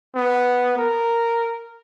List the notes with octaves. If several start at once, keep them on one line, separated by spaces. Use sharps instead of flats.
B3
A#4